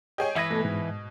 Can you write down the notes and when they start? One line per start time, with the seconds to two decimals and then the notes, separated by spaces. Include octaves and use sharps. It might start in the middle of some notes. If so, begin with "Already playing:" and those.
0.18 G4 G#4 C#5 D#5 G5
0.36 E3 B4 E5 D#6 G#6 A#6
0.51 B2 A3 A4
0.65 G#2